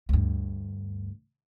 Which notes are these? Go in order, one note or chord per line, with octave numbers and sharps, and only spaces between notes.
D2 G2